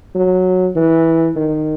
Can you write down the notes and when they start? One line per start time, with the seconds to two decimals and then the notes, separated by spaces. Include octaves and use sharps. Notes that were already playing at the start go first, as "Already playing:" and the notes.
0.15 F#3
0.76 E3
1.36 D#3